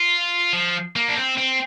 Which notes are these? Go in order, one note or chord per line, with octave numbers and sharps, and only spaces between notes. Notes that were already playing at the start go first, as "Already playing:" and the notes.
Already playing: F4
F3
A#3
D4
C4
C4